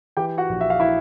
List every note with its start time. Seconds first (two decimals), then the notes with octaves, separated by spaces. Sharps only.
0.17 E3 G4 G5
0.38 F#4 F#5
0.49 A#1
0.61 E5
0.70 F5
0.80 E4 E5